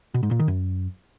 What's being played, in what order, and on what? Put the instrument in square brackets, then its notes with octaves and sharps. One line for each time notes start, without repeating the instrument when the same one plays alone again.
[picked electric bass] B2
G#2
A#2
D#3
F#2